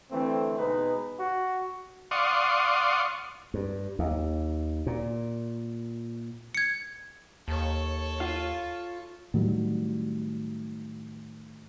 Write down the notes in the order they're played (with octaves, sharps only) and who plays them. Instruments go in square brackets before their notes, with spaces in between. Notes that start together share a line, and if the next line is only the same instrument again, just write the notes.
[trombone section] D3 E3 A3 C4
B2 G#3 D#4 G#4 B4
[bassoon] F#4
[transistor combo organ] D5 F5 F#5 C6 C#6 D#6
[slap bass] G2
D#2
A#2
[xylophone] G#6 C#7
[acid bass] D#2 [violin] A4 C#5
[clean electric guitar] F4 F5
[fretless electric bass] A2 D#3 F#3 G3